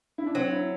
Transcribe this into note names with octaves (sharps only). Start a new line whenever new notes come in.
E4
D4
F#3 C4
E4